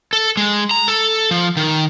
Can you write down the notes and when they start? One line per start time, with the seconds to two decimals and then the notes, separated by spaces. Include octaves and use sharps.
0.13 A4
0.37 G#3
0.71 A#5
0.88 A4
1.31 F3
1.57 D#3